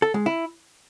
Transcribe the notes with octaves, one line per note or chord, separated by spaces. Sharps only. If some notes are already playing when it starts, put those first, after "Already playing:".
A4
G#3
E4